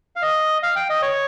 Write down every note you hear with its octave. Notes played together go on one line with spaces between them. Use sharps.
F5
D#5
F5
G5
D#5
C#5